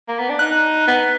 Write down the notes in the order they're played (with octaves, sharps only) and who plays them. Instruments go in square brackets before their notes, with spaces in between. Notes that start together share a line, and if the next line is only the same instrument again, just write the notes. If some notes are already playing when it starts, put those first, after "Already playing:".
[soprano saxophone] A#3
B3
D4
[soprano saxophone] D#4 [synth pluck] F#6
[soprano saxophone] B3